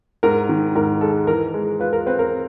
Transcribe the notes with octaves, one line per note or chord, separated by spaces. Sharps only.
G#2 A#4
D#3
G#2 A#4
G#3 A4
E3 A#4
G#3
F4 B4
A#4
C4 B4
A#4